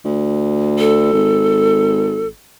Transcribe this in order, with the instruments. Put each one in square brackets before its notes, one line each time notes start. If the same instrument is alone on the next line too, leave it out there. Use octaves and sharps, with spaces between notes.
[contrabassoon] D2
[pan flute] A4
[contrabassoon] G#1